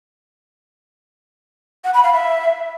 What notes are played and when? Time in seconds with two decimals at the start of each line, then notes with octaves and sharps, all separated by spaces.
1.84 F#5
1.94 B5
2.04 F5
2.13 E5